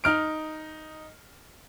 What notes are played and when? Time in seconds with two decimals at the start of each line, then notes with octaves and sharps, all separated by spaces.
0.04 D#4 F6 D7